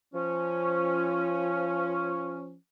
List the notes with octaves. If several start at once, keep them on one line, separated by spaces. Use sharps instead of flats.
F3 C#4